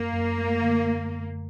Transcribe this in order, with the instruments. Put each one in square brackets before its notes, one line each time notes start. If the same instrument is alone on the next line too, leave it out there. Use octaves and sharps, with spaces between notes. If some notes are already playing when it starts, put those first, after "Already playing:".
Already playing: [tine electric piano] F#2 [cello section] A#3
[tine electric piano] F#2
A3
D3